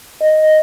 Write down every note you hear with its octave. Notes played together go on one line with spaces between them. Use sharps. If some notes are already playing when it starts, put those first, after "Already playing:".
D#5